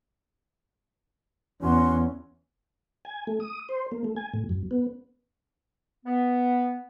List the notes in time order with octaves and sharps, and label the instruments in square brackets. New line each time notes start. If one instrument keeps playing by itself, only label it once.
[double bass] E2 [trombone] C#4 [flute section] F#4 C6
[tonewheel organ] G#5
A3
D#6
C5
A#3
A3
G#5
A2
F#2
B3
[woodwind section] B3